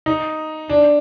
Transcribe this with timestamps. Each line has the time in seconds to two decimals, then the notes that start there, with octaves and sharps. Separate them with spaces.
0.06 D#4
0.69 D4